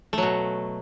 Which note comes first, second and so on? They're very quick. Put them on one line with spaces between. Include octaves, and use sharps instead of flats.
A3 F#3 B2